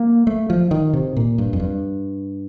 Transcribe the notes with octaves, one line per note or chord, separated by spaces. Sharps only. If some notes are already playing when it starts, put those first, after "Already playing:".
Already playing: A#3
A3
F3
D#3
C3
A#2
G2
F2
G2